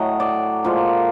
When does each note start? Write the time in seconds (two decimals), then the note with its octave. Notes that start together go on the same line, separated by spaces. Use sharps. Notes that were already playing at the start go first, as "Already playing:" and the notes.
Already playing: A2 F#3 A3 D#5
0.20 D5
0.64 A#2 F3 G#3